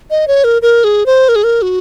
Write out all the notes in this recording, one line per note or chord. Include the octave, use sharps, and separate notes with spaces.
D#5
C#5
A#4
A#4
G#4
C5
A#4
G#4
A#4
F#4